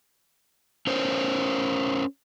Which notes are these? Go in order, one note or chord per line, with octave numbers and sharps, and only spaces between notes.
C#4 A#4 C5 C#5